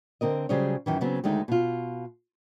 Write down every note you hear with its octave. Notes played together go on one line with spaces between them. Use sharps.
D3 C4 A#4 D#5
C#3 F#3 G3 G#4 C5 C#5
F#2 D#3 E3
C#3 F#3 B3 C4
D2 D#3 G#3 A3 D#4
B2 F4